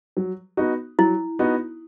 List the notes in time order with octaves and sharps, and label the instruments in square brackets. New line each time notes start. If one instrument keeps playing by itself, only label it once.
[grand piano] F#3
B3 D#4 F#4
[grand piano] F#3 [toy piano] E4
[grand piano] B3 D#4 F#4